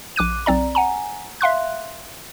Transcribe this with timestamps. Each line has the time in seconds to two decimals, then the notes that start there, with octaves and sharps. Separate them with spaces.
0.16 A#1 D6 F#6 D#7
0.46 B1 C4 D5 A#5
0.75 F#5 G#5 A#5
1.41 E5 F5 C6 F#6